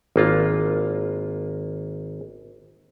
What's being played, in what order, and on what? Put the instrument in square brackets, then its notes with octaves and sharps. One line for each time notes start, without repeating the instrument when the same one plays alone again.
[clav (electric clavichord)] G#1 A#3 F4